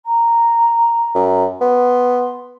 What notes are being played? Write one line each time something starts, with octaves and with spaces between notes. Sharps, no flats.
A#5
F#2
B3 C6